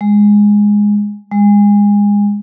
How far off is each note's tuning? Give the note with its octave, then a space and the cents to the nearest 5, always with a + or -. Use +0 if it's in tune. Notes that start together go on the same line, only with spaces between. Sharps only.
G#3 -5
G#3 -25